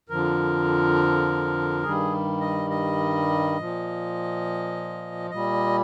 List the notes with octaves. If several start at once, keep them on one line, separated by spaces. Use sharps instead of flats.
F2 D3 F3 A#4
G2 D#3 G3 G#4
D#5
D#5
A#2 F3
A#2 G3 D#5